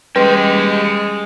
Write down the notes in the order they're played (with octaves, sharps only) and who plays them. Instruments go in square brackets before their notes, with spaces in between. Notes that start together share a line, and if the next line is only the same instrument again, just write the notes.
[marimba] G3 C#4 C6 [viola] G#3 [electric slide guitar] G4 D#5 G5 [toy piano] B4